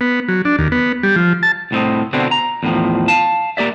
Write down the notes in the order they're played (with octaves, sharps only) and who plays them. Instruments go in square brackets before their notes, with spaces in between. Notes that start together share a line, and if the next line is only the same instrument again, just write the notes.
[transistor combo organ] B3
F#3
D4
D#2
B3
G3
F3
A5
[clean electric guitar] C2 A2 C4 D#5
B2 D3 C4 D4 E4
A#5
E2 A2 C3 D#3 F3
F5 A5
A#3 G4 D5 E5